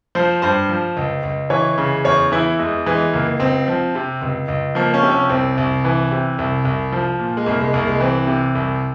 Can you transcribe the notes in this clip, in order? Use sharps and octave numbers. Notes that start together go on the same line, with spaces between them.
F3 C5
G2 C5
F3
C#2
C#2
E3 C#5
C#3
E2 C#5
E3 E4
E2 G#3
E3 G#3
C#2 A#3
C#2 C4
F3
C3
C#2
C#2
F3 A#3
C#4
C3
C#4
C2 C4
C2
E3
C3
C2
C2
F3
A#2
G#3
C2 A#3
G#3
C2 A#3
G#3
E3 C4
C3
C2